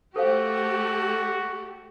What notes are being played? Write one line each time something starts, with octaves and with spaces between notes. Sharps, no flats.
A3 F#4 G4 A4 C5 F5